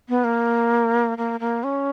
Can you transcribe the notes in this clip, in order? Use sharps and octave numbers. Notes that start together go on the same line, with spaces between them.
B3
A#3
A#3
A#3
C#4